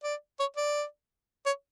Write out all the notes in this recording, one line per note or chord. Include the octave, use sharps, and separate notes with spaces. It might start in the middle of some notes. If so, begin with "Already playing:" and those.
D5
C#5
D5
C#5